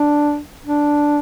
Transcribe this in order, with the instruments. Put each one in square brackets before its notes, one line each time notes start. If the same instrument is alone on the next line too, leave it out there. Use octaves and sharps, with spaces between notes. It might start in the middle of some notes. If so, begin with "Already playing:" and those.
Already playing: [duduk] D4
D4